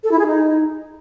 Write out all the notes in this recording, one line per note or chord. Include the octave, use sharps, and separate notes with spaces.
A4
E4
G#4
D#4